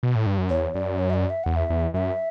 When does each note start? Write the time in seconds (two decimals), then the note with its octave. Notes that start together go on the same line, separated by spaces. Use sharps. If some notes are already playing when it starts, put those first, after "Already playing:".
0.03 B2
0.15 A2
0.26 G2
0.38 F#2
0.49 E2 C#5
0.74 F#2 D5
0.99 C#5
1.10 E5
1.14 D5
1.30 E5
1.44 E2 F#5
1.56 E5
1.70 E2
1.94 F#2 E5